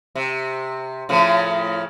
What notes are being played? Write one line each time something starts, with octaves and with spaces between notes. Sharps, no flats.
C3
A2 C#3 F3